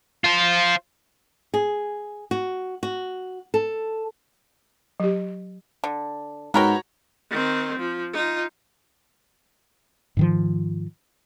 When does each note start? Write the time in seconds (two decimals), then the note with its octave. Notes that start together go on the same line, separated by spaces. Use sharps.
0.24 F4 C5
1.54 G#4
2.31 F#4
2.83 F#4
3.54 A4
5.00 F#3 G4
5.84 D3
6.54 G#2 B3 F#4 A#4 C#5 G5 A#5
7.30 D#3 C4
7.79 F3
8.13 D#4 F4
10.17 G#2 D#3 F3